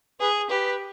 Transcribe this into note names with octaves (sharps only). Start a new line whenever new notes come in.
G#4 B4
G4 B4